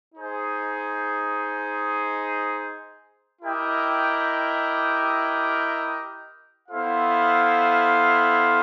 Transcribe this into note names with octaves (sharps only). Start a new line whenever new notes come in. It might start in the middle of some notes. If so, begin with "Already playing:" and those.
D#4 G#4 C5
E4 G4 A#4 D#5 G5
B3 E4 A4 C5 F5